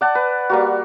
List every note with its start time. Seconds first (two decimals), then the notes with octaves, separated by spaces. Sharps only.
0.01 D5 F#5 A5
0.15 B4
0.50 G3 A#3 F#4